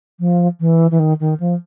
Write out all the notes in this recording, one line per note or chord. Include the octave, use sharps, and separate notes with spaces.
F3
E3
E3
D#3
D#3
F3